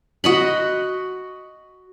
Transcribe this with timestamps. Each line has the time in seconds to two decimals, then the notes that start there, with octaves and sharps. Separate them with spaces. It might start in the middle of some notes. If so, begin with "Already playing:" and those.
0.24 F#4 D#5 B5